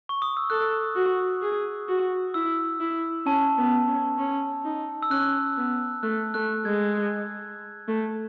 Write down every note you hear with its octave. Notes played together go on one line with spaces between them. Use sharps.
C#6
D#6
E6
A4 F#6
F#4
G#4
F#4
E4 E6
E4
C#4 A5
B3
C#4
C#4
D#4
E6
C#4 F#6
B3
A3 F#6
A3 F#6
G#3 G#6
F#6
A3